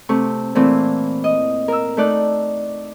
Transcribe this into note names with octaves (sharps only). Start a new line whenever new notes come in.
C3 A3 C#6
A#2 E3 A3 C4
D#5
A#4 E6
A3 D#4 D5 F#6